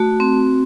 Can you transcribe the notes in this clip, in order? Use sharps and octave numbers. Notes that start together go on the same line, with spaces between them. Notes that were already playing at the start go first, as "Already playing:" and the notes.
Already playing: A3 F#4
C4